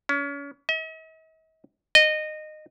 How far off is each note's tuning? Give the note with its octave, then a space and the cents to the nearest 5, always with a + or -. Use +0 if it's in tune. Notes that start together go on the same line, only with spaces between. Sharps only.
C#4 +35
D#5 +45
D#5 -20